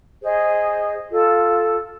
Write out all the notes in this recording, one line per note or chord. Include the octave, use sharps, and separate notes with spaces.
G#4 C5 D#5
F4 A4